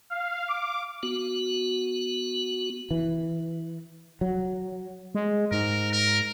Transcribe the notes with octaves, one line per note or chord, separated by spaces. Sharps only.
F5
D6
B3 F#4
E3
F#3
G#3
G#2 A#4
A#4